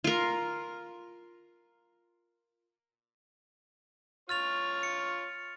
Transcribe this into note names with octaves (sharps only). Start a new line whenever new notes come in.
F4 A#4
F4 C#5 F6 A6 F7
C#7